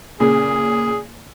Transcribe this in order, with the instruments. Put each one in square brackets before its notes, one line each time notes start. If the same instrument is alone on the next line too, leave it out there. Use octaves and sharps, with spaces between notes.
[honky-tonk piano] A#2 C#3 [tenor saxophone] G#4